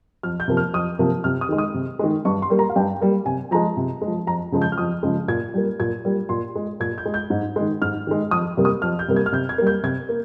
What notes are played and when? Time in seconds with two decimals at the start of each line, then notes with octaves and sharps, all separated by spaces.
0.23 F2 F6
0.40 G6
0.48 C3 F3 A#3
0.57 F6
0.73 F2 D#6
0.99 C3 F3 A#3
1.24 C3 F6
1.41 D#6
1.49 D#3 G#3
1.58 D#6
1.74 C3
1.99 D#3 G#3
2.25 G2 C#6
2.42 C6
2.50 G3 A#3
2.59 A#5
2.69 F5
2.76 G2 G5
3.01 G3 A#3
3.26 C3 G#5
3.51 F3 G#3 A#5
3.77 C3
4.02 G#3
4.07 F3
4.27 F2 A#5
4.52 C#3 F3 G#3
4.62 G6
4.72 F6
4.78 F2 D#6
5.03 C#3 F3 G#3
5.28 A#2 G#6
5.54 G3 A#3
5.80 A#2 G#6
6.05 G3 A#3
6.29 A#2 C6
6.56 G#3
6.80 A#2 G#6
6.98 G6
7.06 G#3
7.14 G6
7.30 G#2
7.56 D#3 G#3
7.82 G#2 F6
8.07 D#3 G#3
8.31 F2 D#6
8.57 C3 G3 A#3
8.65 D#6
8.82 F2 F6
8.99 G6
9.08 C3 G3 A#3
9.16 G#6
9.26 F6
9.32 C3 G6
9.49 G#6
9.58 G3 A#3
9.67 G6
9.83 C3 G#6
10.09 A#3